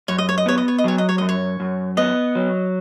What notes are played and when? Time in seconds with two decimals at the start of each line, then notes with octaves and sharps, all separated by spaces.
0.08 F#2 C#5
0.18 D#5
0.29 C#5
0.38 D#5
0.46 B3 C#5
0.58 D#5
0.68 C#5
0.78 D#5
0.84 F#3 C#5
0.98 D#5
1.09 C#5
1.18 F#2 D#5
1.29 C#5
1.60 F#2
1.97 B3 D#5
2.35 F#3